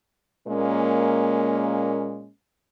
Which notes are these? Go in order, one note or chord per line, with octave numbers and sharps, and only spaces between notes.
A#2 G#3 A#3 C#4